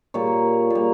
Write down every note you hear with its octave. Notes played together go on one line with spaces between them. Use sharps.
A#2 G3 C#5
A#2 G3